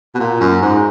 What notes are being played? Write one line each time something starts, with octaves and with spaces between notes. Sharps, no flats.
B2
A#2
F#2
G#2